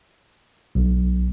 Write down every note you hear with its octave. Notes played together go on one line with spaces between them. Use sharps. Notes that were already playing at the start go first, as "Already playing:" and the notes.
B1